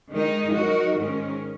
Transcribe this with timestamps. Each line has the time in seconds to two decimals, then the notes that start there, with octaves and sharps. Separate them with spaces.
0.13 D#3 G#3 D#4
0.54 F#3 D#4 F#4 A#4
0.97 G#2 D#3 G#3 C#4 A#4